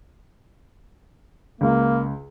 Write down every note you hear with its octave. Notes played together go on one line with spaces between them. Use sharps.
C#2 A#3